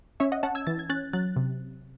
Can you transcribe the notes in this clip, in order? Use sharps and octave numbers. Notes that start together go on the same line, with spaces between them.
C#4 C#5 E5
D#5 F#5
C#4 F#5 A5
E6 G#6
E3 A6
G#6
C#4 F#6 A6
F#3 F#6 A6
C3